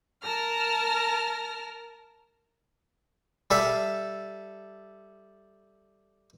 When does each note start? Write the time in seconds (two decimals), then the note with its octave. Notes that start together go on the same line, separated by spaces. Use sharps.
0.22 A#4 A5 F6 A#6
3.51 G3 A4 E5 F5